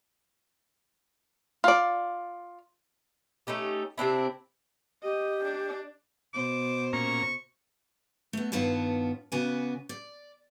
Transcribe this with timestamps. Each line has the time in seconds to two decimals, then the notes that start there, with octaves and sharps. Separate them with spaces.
1.64 F4 D5
3.47 A3 C#4 D#4 G4
3.98 C3 C4 D4 E4
5.03 G4 D#5
5.45 D4
6.34 B2 C5 D6
6.93 A#2 C#4 A#5 C#6
8.33 A3 B3
8.52 G2 D#3 B3 F4 C#5 A5
9.32 C#3 B3 F#4 D5 G#5
9.89 D5